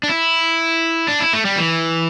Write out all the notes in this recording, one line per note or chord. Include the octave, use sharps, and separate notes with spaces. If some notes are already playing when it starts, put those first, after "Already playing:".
D4
E4
D4
E4
A3
G3
E3